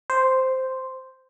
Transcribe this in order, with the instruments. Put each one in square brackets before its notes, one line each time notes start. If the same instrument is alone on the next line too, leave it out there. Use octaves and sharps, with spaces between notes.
[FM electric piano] C5